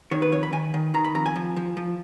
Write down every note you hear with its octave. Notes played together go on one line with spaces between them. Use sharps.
D#3 C#5
B4
F2 C#5
B5
D#3 G#5
D#3
D#3 A#5
B5
F2 A#5
G#5
F3
F3
F3